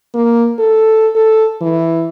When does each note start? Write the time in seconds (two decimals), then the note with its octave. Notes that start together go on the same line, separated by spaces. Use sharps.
0.15 A#3
0.60 A4
1.15 A4
1.62 E3